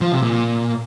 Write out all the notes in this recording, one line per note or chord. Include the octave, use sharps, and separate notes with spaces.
F3
C3
A#2